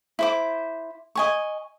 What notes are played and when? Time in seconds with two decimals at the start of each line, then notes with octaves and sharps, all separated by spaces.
0.19 E4 C5 D6
1.15 D#5 G#5 C#6